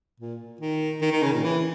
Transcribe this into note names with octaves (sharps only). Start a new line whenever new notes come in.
A#2
D#3
D#3
D#3
C#3
A#2
E3